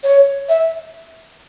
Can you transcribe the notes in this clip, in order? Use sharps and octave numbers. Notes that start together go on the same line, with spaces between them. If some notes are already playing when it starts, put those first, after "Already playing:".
C#5
E5